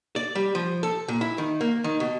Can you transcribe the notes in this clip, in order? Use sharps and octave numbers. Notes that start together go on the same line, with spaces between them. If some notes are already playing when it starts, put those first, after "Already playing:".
D5
G3
F3
A4
A#2
E4
D#3
A#3
D#3
B2